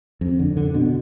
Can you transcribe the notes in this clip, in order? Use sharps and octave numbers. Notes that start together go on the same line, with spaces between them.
F2
D3
D3
B2